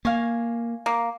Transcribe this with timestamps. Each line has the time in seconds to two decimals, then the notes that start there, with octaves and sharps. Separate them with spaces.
0.05 A#3 F5 G#5 C#6
0.86 A#3